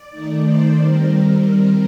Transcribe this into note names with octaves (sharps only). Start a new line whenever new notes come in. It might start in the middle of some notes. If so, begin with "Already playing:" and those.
Already playing: D5
D#3 A3 D#4
C5
D#3 G3 C4 A#4